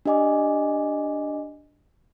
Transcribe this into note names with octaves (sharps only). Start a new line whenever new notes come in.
D4 G4 D#5 G#5 D6